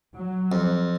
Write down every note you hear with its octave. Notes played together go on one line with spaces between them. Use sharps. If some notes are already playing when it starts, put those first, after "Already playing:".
F#3
F2